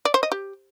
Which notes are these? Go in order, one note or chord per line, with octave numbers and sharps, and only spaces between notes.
D5
C5
D#5
G4